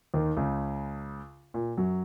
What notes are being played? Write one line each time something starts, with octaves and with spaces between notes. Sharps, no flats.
D#2 D#3
C#2 C#3
A#2
F#2 F#3